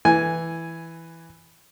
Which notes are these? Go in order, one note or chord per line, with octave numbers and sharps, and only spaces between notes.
E3 G#5